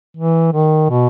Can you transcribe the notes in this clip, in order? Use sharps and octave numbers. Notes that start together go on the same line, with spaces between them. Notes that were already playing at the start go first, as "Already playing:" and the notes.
E3
D#3
B2